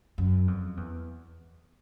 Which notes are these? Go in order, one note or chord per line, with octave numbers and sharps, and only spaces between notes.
F#2
F2
E2